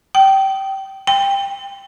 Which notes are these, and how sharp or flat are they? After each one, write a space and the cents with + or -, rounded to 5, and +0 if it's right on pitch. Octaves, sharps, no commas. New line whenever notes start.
G5 -20
G5 +15